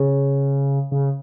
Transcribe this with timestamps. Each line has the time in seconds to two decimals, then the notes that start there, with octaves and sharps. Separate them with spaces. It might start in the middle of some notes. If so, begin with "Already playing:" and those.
Already playing: C#3
0.92 C#3